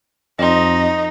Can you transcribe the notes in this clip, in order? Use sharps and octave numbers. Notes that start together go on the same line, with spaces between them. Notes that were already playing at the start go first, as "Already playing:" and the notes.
F2 D#4 D#5 C6